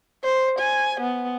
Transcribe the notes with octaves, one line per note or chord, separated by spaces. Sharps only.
C5
G#5
B3